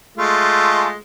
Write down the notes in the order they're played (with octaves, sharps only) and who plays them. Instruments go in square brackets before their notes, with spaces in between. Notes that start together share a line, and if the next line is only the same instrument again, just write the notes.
[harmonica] G#3 A3 F4